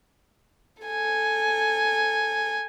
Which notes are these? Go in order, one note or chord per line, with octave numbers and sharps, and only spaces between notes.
A4 G#5